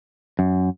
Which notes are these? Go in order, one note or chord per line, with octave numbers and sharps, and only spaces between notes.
F#2